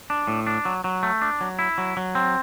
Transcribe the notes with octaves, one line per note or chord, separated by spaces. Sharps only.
D4
A2
D4
F#3
F#3
A3
D4
F#3
E4
F#3
F#3
C4